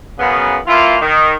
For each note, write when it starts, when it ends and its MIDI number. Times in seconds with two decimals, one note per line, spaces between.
0.19 0.57 42
0.19 0.57 49
0.19 0.57 59
0.67 0.97 52
0.67 0.97 58
0.67 0.97 64
0.67 0.97 65
1.02 1.34 51